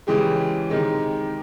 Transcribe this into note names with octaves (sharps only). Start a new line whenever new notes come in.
C#3 E3 G#3 G4
C3 D#3 G#3